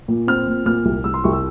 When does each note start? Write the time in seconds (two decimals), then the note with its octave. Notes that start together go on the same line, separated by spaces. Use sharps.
0.08 A#2
0.27 C4 F6
0.47 A#2
0.66 A#2 F6
0.85 C2
1.04 C2 E6
1.14 C6
1.24 C2 C#6
1.33 E6